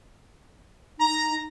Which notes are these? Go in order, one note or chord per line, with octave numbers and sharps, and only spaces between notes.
D#4 A#5